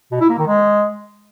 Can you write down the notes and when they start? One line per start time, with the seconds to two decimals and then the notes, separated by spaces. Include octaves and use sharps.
0.12 B2
0.21 E4
0.30 A#3
0.38 D#3
0.47 G#3